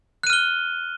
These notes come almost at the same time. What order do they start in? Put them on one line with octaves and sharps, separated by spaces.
F#6 D#7 F6 G7